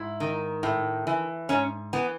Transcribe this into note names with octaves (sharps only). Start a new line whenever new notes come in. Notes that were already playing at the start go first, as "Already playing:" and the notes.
Already playing: G#2 E4
D#3
A2
E3
G#2 C#4
E3 B3